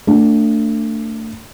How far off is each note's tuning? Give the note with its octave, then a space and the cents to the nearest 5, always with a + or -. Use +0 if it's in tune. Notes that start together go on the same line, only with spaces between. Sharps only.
A3 +30 D4 -5